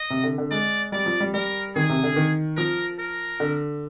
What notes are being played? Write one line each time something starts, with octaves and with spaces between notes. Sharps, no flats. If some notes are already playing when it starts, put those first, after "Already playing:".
Already playing: D#5
C3
D3
D3
G#3 D5
G3 D5
F3
G3
G3 A#4
D#3 G#4
C3
D3
D#3
F3 A#4
A#4
D3